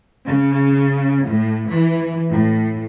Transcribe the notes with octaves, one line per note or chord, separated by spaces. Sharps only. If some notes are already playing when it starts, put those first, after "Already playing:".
C#3
A2
E3
A2